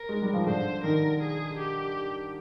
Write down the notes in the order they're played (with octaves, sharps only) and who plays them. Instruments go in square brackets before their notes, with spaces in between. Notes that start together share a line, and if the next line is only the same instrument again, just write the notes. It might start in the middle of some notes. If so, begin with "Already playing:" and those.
Already playing: [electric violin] A#4
[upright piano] G#3
G3
F3
[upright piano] D3 [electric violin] C5
[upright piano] D#3 [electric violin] A#4
[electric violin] G#4
G4